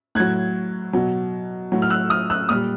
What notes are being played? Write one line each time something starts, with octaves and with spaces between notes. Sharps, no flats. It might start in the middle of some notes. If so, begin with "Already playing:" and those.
A2 F#3 F#6 G#6
B2 F#3
A2 F#3
F6
E6 F#6
D#6 F6
E6 F#6
A#2 G3 D#6 F6